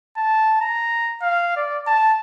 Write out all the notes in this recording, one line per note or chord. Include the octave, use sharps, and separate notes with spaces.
A5
A#5
F5
D5
A5